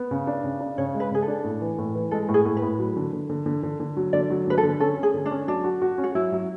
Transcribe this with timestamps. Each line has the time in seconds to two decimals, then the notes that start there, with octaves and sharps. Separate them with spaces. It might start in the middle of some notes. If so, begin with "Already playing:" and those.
Already playing: B3
0.11 C#3
0.27 D4
0.44 C#3
0.60 D4
0.78 C#3 C#5
0.94 G#3
1.00 B4
1.11 C#3 G#4
1.22 A4
1.28 D4
1.44 A2
1.61 E3
1.78 A2
1.95 E3
2.11 G#3 A4
2.29 A2
2.34 G#4
2.45 A2
2.57 B4
2.62 A2
2.79 F#3
2.96 D3
3.13 D3
3.29 D3
3.46 D3
3.63 D3
3.80 D3
3.97 F#3
4.13 D3 D5
4.30 F#3
4.47 D3 B4
4.58 A4
4.63 D3
4.80 C#4 A4
4.97 C#4
5.03 G#4
5.14 D3
5.26 D4
5.31 C#4
5.48 F#3 D4
5.64 F#4
5.82 F#4
5.98 C#4
6.04 F#4
6.15 F#3 E4
6.32 F#3